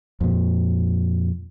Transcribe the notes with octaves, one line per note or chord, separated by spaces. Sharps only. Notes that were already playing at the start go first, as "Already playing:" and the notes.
F2 A#2